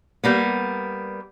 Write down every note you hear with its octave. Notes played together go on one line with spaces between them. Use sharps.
G3 A#3 B3